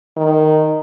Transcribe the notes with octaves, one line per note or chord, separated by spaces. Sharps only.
D#3